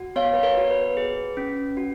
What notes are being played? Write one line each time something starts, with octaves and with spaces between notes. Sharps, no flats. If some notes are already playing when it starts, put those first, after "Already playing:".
Already playing: F#4
B3 C#5 F5
B4
A#4 C#5
F#4
B4
G#4
C#4
F#4